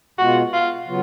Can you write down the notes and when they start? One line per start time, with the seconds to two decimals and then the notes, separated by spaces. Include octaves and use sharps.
0.18 B2 G#3 B3 F4 F#4
0.53 F4
0.87 C#3 F#3 B3 F4